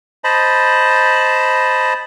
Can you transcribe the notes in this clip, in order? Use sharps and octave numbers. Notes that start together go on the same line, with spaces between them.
C5 D#5 A5 B5